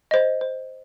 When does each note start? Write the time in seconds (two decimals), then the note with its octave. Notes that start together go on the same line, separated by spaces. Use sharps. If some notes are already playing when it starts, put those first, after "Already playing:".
0.11 C5 D#5
0.41 C5